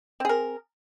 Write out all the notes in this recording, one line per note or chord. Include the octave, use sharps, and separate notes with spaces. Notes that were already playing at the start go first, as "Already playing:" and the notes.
C4 G#4 A#4